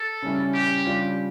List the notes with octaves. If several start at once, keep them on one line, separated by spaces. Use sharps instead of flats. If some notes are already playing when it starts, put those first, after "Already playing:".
Already playing: A4
C#3 G3 C#4 E4
G4
C#3 G3 D4 F4